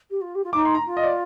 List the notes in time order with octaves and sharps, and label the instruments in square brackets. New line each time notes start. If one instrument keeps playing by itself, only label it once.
[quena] G4
F4
G4
F4
[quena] D#4 [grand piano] D6
[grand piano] C6
A#5
[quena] F4
[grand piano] D#5
D5